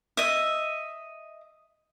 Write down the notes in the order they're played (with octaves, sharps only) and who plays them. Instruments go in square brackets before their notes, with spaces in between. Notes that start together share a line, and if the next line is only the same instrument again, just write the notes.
[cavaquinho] D#5 E5